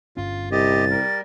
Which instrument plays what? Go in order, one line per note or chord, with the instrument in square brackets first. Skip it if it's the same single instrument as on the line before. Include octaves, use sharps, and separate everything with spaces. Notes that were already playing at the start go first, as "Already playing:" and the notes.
[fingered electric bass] G1 G2 C#4 [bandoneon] F4
[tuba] C2 [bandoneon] G4 D#5 [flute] A6
[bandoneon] G3 A#4